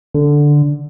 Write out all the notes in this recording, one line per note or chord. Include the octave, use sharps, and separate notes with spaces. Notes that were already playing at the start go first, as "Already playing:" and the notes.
D3